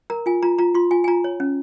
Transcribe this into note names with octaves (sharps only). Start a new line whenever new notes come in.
A#4 A#5
F4 G#5
F4 A#5
F4 A#5
F4 C6
F4 G#5
G#5
F4 A#5
C#5
C#4